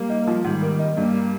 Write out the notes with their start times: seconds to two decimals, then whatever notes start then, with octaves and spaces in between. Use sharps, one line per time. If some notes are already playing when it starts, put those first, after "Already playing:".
Already playing: G3 A#3
0.10 D#4
0.27 F3
0.44 G#2 D#3 G3
0.62 A#3
0.79 D#4
0.97 G2 G3 A#3